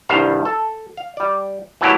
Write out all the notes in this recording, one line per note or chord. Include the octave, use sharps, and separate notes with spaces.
C2 G2 D#3 G3 C5 F5
A4
F5
G3 D5
E3 F#3 A3 A#3 E4 G4